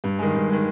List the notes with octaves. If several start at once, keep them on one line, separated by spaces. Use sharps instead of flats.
G2
D#3 G#3
G2
D#3 G#3